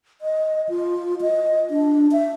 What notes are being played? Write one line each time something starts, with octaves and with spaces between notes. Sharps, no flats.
D#5
F4
D#5
D4
E5